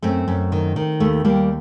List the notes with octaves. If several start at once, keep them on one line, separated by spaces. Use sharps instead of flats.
F#2 A3 C4
F#2
D#3
D#3
D#2 A3
D#2 G3 A#3